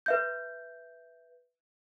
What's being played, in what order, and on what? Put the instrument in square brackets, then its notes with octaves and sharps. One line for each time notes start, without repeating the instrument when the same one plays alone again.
[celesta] B4 E5 G6